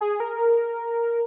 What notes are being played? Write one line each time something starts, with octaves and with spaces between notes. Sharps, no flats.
G#4
A#4